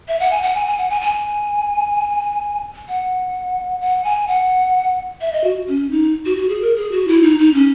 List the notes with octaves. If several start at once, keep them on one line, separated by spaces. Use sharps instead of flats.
E5
F#5
G#5
F#5
G#5
G#5
F#5
G#5
G#5
F#5
F#5
G#5
F#5
E5
D#5
F#4
C#4
D#4
F#4
F#4
G#4
A#4
G#4
F#4
E4
D#4
D#4
C#4